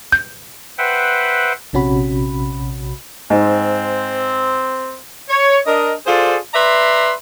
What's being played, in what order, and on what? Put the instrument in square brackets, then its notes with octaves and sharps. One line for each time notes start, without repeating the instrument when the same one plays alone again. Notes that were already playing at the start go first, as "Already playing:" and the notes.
[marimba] G6
[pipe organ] B4 C5 E5 F#5 G5
[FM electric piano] A#1 C3 C#4 F#4 B5
[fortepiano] G#2 [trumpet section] C4
[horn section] C#5
D4 A#4 D#5
F4 G#4 A4 C5 D5
B4 D5 E5 A#5 C6